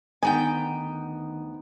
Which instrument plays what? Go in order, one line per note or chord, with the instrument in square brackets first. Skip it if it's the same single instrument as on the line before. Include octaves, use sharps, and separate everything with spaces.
[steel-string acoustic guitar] D2 B3 G5 [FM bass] D#3 [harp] D#4 [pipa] G#5